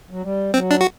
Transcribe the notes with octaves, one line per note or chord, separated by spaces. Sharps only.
F#3
G3
F#3 C4
D4
F#4